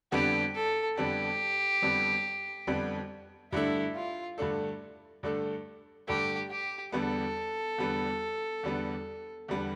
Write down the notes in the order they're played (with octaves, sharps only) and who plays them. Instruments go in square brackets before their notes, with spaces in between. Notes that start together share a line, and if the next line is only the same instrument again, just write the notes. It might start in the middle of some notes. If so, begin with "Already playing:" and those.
[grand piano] F2 D3 G3 B3 D4 [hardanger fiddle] G4
[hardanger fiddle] A4
[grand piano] F2 D3 G3 B3 D4 [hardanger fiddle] G4
[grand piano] F2 D3 G3 B3 D4
F2 D3 G3 B3 D4
[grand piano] G2 D3 A3 D4 A4 [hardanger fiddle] E4
[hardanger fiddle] F4
[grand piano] G2 D3 A3 D4 A4
G2 D3 A3 D4 A4
[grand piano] G2 D3 A3 D4 A4 [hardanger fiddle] G4
[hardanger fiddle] G4
[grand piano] E2 D3 G3 B3 [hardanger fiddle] A4
[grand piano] E2 D3 G3 B3
E2 D3 G3 B3
E2 D3 G3 B3